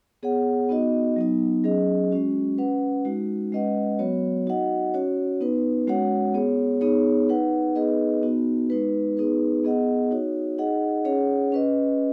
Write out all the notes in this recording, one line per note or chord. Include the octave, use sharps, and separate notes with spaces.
B3 G#4 C#5 F#5
B3 D#4 F#4 D#5
F#3 B3 D#4
F#3 C#4 G#4 D#5
G#3 C#4 F#4
C#4 B4 F#5
G#3 D#4 F#4
G#3 C#4 B4 D#5 F#5
F#3 B3 F#4 C#5
D#4 F#4 D#5 F#5
C#4 F#4 C#5
B3 D#4 B4
G#3 C#4 F#4 C#5 F#5
B3 G#4 C#5
B3 D#4 G#4 C#5
D#4 B4 F#5
B3 D#4 G#4 B4 D#5
B3 D#4 F#4
G#3 D#4 B4
B3 D#4 G#4 B4
B3 G#4 D#5 F#5
D#4 F#4 C#5
D#4 G#4 D#5 F#5
C#4 G#4 C#5 F#5
C#4 B4 D#5